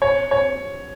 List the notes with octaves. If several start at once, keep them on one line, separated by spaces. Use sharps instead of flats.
C#5
C#5